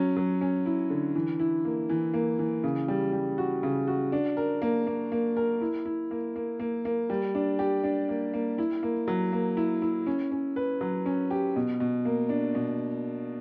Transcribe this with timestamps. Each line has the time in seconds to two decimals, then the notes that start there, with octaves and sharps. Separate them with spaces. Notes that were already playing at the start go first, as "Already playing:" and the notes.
Already playing: F#3 C#4
0.16 F#3
0.41 C#4
0.66 E4
0.90 D3
1.15 E3
1.39 E4
1.65 A#3
1.89 E3
2.14 A#3
2.39 E3
2.64 C#3
2.88 G3
3.13 G3
3.38 F#4
3.63 C#3
3.88 F#4
4.12 D4
4.37 A#4
4.62 A#3
4.87 A#3
5.12 A#3
5.37 A#4
5.61 E4
5.85 E4
6.11 A#3
6.36 A#3
6.59 A#3
6.85 A#3
7.10 G3
7.35 D4
7.59 G4
7.83 D4
8.09 A#3
8.33 A#3
8.58 E4
8.83 A#3
9.08 F#3
9.33 A#3
9.57 E4
9.82 E4
10.06 C#4
10.31 C#4
10.56 B4
10.81 F#3
11.06 C#4
11.31 G4
11.56 B2
11.80 B2
12.05 A#3
12.29 D4
12.55 B2